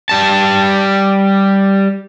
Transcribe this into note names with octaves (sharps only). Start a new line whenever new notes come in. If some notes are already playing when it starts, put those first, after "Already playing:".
G3 A5